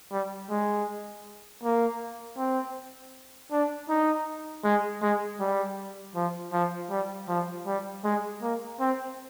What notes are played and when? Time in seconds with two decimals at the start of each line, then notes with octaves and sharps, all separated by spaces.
0.12 G3
0.50 G#3
1.63 A#3
2.38 C4
3.52 D4
3.89 D#4
4.64 G#3
5.02 G#3
5.40 G3
6.15 F3
6.53 F3
6.91 G3
7.29 F3
7.66 G3
8.04 G#3
8.42 A#3
8.80 C4